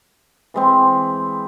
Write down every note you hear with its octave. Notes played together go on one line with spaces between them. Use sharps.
E3 G#3 C4